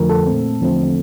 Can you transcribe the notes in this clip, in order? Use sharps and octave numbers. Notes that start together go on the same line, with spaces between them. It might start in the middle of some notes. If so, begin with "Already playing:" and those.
Already playing: F2 D3 F3 A3 A#4
A4
A#2 A3 C4
E2 D3 F3 A3 C4